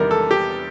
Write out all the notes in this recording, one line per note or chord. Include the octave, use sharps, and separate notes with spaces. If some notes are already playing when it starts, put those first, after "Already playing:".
Already playing: E2 C3 D#3 G3 B3 A#4
A4
G4